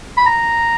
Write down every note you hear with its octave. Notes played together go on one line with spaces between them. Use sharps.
B5
A#5